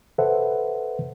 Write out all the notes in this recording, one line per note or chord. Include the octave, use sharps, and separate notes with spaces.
A4 B4 C5 E5 F#5